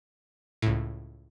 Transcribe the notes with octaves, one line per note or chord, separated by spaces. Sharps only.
C#2 A2